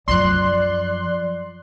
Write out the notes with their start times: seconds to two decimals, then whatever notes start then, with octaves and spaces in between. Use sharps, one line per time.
0.08 F#2 F3 D5 C6 F#6